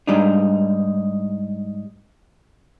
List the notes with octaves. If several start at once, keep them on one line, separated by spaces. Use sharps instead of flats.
G#2 G3 D4 D#4